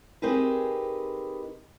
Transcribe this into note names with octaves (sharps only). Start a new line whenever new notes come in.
C4 D#4 G4 G#4 A#4 B4